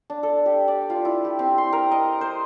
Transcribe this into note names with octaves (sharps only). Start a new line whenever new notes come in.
D4
A4
G4
D5
F4
E4
G4
C4
C6
A#4
D#5
C5